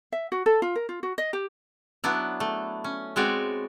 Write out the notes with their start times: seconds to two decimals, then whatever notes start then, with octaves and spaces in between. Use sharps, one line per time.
0.12 E5
0.32 F#4
0.46 A4
0.62 F4
0.75 A#4
0.89 F4
1.03 F#4
1.18 D#5
1.33 G4
2.04 F#3 B3 D4 E4
2.40 A3
2.84 C#4
3.16 G#3 B3 C4 F#4 C#5 D5